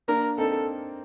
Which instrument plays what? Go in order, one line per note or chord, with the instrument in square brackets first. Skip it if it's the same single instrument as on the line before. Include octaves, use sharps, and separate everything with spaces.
[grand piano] A#3 D4 [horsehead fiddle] A#4
[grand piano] C4 D#4 [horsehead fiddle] A4